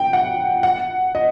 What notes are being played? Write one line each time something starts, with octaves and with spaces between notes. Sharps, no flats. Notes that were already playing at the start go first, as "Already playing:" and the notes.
Already playing: G5
F#5
F#5
D#5